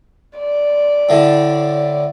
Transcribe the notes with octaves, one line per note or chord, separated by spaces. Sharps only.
D5
A2 D3